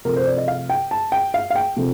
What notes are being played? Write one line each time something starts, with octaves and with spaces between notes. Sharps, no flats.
C3 F3 A3 A#4
C5
D5
D#5
F5
G5
A5
G5
F5
F5
G5
C3 F3 A3